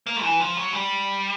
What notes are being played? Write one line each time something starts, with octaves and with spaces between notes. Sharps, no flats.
A#3
E3
F3
F#3
G3